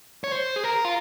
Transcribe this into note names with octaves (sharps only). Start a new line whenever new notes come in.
C#5
C5
G#4
A#4
F4